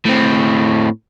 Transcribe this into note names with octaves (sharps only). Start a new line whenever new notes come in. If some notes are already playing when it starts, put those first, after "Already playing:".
A2 C4